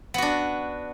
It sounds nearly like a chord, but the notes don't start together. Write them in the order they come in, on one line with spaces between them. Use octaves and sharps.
B3 F#4 D4